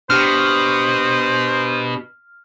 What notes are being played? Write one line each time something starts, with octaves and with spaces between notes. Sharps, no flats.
B2 D4 G4 C5 F6